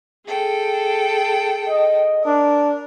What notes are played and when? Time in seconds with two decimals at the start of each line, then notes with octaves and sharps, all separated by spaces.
0.25 G#4 A4 G5
1.69 D#5
2.25 D4 A#4